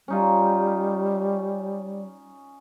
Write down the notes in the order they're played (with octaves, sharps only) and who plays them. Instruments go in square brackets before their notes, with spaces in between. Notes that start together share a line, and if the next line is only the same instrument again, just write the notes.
[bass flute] G3 [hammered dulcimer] C#4 D#4 F4